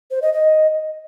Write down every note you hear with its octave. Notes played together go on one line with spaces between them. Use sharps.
C5
D#5
D#5